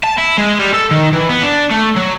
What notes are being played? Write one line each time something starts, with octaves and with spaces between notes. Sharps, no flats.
A5
E4
G#3
G3
A4
D#3
E3
B3
D4
A3
F#3